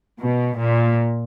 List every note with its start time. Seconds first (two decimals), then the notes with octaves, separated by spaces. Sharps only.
0.21 B2
0.58 A#2